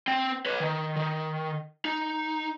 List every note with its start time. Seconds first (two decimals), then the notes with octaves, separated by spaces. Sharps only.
0.08 C4 G5
0.46 B4 C#5
0.60 D#3
0.96 D#3
1.85 D#4